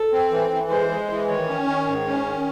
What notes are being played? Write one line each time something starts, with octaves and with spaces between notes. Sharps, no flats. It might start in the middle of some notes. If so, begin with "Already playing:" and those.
Already playing: A4
C4
E3
E3
G#3 C5
G#3
E3
D#3 C#5
C#4
D#3
G#2
C#4
D#3